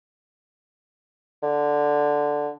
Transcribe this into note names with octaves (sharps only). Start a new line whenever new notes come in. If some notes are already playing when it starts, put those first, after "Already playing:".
D3